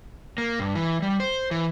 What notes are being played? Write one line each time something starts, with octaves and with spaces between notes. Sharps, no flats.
A#3
G2
E3
G3
C5
E3